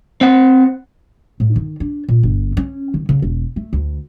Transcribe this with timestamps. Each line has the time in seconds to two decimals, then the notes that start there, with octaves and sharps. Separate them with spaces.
0.21 C4 F#5
1.40 A2
1.56 D#3
1.80 D4
2.08 A#2
2.23 G1
2.57 C#4
2.94 D#3
3.09 C#3
3.22 E1
3.56 A3
3.73 D2